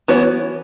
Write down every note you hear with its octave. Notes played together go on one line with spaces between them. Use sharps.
E3 B3 F#4 C#5